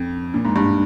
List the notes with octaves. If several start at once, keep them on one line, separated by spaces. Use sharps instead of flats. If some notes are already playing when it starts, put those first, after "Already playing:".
Already playing: F2
A#2
G#2
G2